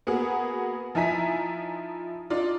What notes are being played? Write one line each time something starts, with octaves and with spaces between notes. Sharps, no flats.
A#3 B3 F#4 G#4
F3 D#4 E4 G#5 A#5 B6
D4 D#4 F4 D5